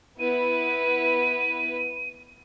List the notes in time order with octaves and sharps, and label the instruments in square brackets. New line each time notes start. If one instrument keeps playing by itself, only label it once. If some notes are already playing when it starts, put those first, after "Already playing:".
[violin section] B3 E4 B4 [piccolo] D#7